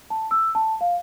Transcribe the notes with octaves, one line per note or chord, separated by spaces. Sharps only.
A5
E6
A5
F5